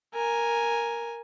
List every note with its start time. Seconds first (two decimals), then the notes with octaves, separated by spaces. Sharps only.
0.14 A#4 G#5